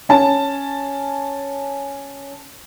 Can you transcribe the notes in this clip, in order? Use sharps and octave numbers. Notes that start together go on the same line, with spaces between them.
C#4 A5